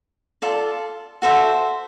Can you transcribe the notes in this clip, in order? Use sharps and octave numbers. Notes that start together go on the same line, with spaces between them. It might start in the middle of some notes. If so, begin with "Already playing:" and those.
F4 A4 D5
F#4 A4 C5 E5